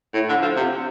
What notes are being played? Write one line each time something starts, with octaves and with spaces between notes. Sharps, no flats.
A2
D3
F3
C3